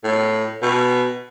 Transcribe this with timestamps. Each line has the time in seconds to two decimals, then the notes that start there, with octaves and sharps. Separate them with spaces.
0.04 A2
0.62 B2